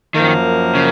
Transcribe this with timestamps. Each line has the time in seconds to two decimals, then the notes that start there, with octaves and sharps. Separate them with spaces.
0.14 F#2 D#3 F3 A#3
0.75 C#3